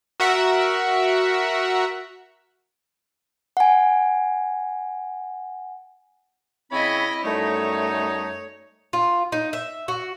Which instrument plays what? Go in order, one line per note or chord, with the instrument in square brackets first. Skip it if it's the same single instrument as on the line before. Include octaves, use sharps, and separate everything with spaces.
[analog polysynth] F#4 A#4 E5 F#5
[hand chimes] F#5 G#5
[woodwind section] C#3 C4 C#5 [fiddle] E4 D#5 [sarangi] B5
[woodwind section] F#2 G3 D#4 [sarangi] A3 [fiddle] C#5
[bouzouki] F4
D#4
E5
F#4